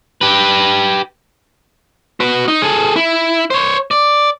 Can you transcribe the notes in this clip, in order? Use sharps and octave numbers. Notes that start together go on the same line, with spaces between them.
G4 B4
F#4 B4
D#4
G#4 A4
E4
C5 C#5
D5